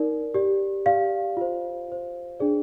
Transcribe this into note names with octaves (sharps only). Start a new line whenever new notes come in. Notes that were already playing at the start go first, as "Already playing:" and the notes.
Already playing: D#4 A#4 D5
G4 D5
G4 D5 F5
F4 C5
F4 C5
D4 G#4 D5